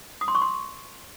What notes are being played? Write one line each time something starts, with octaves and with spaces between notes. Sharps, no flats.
D#6
C6
C#6
C6